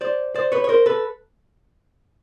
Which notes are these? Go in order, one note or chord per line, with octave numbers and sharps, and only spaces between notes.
C5 D5
C5 D5
B4 C#5
C#5
A#4 C5
A4 B4